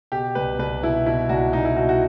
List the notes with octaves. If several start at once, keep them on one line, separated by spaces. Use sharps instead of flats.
B2 G4
C2 B4
C2 B4
B2 E4
B2 E4
C2 F#4
C2 D#4
E4
B2 F#4
F#4